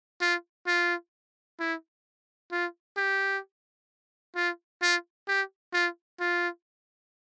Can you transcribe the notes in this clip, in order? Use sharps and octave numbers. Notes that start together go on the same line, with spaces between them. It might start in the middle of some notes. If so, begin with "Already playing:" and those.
F4
F4
E4
F4
G4
F4
F4
G4
F4
F4